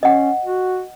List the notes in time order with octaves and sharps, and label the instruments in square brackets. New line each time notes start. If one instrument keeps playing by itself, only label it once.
[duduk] C#4 [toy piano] D#5 F#5
[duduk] F#4